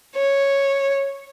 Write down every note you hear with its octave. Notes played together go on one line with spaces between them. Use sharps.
C#5